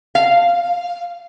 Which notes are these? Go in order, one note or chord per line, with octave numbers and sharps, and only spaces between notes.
F5